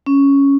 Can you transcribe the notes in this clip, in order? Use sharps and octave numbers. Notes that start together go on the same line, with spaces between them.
C#4